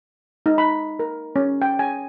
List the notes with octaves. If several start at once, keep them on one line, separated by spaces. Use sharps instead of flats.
D#4
B5
A#4
C#4
G5
G#5